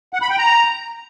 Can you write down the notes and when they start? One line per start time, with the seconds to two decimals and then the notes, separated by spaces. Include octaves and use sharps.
0.13 F#5
0.22 B5
0.30 G5
0.38 A#5